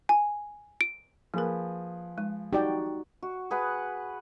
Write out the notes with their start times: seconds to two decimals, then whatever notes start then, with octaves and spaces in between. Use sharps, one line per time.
0.09 G#5
0.81 D7
1.34 F3 A#3 G#4 A#4 B4
2.18 G#3
2.53 D#4 F#4 G4 D5 G5
3.23 F#4
3.51 G#4 B4 F#5